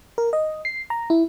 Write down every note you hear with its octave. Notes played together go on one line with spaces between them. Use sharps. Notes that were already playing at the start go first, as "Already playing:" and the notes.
A#4
D#5
C7
A#5
E4